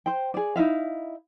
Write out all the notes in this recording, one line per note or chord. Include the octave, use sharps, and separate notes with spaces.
C5 G5
G#4 D5
D#4 E4 E5 F5